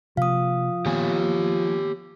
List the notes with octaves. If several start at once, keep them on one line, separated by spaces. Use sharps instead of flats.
C3 F3 A#3 F5 D#6
D#3 A#3 B3 G4 C#5 G#5